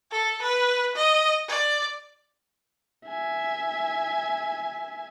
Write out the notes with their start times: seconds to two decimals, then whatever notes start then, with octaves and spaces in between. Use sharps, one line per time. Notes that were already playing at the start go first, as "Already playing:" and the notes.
0.12 A4
0.42 B4
0.95 D#5
1.48 D5
3.06 E5 G#5